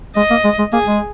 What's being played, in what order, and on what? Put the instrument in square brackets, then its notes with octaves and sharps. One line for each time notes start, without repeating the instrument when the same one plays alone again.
[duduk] G#3 [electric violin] D#5
[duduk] A#3
G#3
G#3
[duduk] A#3 [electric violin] G#4
[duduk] G#3